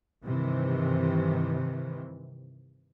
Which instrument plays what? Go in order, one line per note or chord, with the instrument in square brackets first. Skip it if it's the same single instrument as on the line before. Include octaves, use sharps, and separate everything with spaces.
[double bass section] G2 C3 D#3 E3